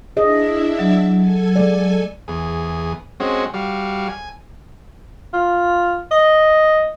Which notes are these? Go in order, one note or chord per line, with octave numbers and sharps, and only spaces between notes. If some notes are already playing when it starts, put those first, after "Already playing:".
D4 E4 G#4 D#5 E5
F#3
A4 G#5
G#3 D5
E2 G#4
G#3 C4 C#4 F#4
G3 F#4 F5
G#5
F4
D#5